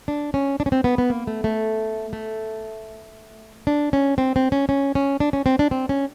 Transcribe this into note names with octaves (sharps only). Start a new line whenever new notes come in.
D4
C#4
D4
C#4
C4
B3
B3
A#3
A3
A3
A3
D4
C#4
C4
C4
C#4
C#4
C#4
D4
C#4
C4
D4
C4
C#4